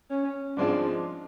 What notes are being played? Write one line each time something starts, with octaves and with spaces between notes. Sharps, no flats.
C#4
G#2 F3 G#3 C4 D4 F4